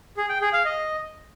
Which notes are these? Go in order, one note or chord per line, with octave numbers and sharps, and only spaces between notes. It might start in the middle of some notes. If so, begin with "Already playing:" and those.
G#4
G5
G#4
F5
D#5